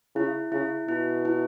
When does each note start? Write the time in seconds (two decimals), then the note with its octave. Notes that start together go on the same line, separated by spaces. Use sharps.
0.15 C#3 E4
0.52 C#3 E4
0.88 B2 E4
1.25 E4